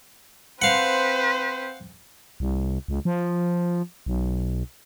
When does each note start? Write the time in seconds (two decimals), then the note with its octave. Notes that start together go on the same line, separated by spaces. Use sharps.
0.62 C4 B4 C5 F5 F#5
2.40 C2
2.88 C#2
3.05 F3
4.06 B1